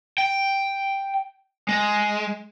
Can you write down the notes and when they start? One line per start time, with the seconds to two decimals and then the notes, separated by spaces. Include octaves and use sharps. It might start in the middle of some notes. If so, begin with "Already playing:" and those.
0.18 G5
1.68 G#3